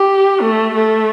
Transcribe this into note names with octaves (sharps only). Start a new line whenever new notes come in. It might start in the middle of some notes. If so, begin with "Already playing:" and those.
Already playing: G4
A3
A3